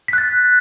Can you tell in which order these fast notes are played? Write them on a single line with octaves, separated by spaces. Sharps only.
B6 F#6 A6